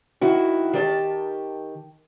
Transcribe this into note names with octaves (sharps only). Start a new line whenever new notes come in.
D#3 E4 F#4
D#3 G4 D5 A5